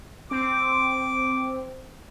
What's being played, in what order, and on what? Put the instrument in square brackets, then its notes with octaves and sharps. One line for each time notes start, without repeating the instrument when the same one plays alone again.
[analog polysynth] C4 [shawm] D6